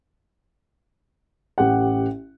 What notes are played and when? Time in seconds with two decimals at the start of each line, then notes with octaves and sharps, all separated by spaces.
1.58 A1 G4 F#5